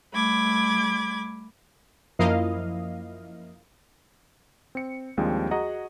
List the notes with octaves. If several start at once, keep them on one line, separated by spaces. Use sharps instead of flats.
G3 A3 B5 D6 G#6
F#2 F3 A#3 E4 D#5 F5
C4 C#7
D#2 F3 G3 G#3 C4 D4
F#4 G#4 D#5 F#5 A#5